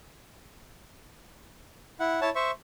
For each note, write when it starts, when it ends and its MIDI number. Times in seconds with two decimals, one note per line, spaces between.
2.00 2.20 64
2.00 2.20 78
2.21 2.30 64
2.21 2.30 73
2.21 2.30 81
2.35 2.51 72
2.35 2.51 76
2.35 2.51 85